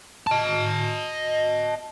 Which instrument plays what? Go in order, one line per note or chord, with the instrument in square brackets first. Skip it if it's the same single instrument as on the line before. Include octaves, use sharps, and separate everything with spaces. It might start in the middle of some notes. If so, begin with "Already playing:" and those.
[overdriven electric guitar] D#5 A5